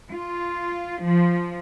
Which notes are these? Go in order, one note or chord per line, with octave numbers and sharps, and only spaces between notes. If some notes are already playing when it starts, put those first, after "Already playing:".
F4
F3